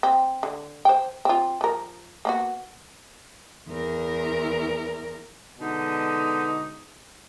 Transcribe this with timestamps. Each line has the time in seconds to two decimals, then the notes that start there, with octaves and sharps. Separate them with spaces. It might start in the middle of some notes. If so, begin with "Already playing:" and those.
0.03 C4
0.43 D3
0.85 C5 G5
1.25 C4 F4
1.61 F3 A#4
2.25 A#3 B3 F#4
3.69 E2 A#4
5.59 B2 D3 G#3 D#4